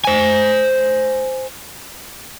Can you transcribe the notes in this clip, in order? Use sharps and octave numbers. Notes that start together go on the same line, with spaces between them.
C5 G#5